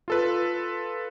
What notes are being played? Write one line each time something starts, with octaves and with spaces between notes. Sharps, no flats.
F4 A4 B4